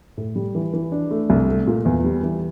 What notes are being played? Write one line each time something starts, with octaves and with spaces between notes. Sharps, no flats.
A2
G3
E3
E3
D4
A3
C2
A3
A#2
E2
G3
E3